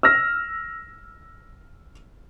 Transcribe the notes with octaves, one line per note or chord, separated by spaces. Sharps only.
E6 F6 A#6